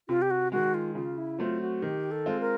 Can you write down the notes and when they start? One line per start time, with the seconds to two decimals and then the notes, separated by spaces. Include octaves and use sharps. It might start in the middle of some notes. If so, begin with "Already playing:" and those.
0.09 C3 F4
0.22 G4
0.31 F#4
0.52 D#3 G#3 F#4
0.74 F4
0.95 C#3 F4
1.18 E4
1.39 F#3 A3 C4 F4
1.61 F#4
1.82 D#3 G4
2.11 A4
2.26 G#3 C4 F4
2.40 A#4